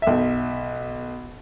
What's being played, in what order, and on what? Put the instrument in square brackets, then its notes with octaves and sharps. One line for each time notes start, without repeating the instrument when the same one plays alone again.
[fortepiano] B1 E5